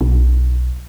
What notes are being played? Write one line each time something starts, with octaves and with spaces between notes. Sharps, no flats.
B1